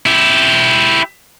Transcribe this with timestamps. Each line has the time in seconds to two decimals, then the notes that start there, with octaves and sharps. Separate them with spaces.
0.06 E4 G4